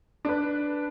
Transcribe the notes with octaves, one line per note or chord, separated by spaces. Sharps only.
D4 B4